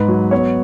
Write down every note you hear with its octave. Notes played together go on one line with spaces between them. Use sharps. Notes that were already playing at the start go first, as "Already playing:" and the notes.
Already playing: G#2 B4
F#3
B3 C#5